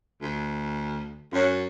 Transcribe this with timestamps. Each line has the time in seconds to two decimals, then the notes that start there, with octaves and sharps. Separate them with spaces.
0.21 D2
1.33 F#2 C#4 C#5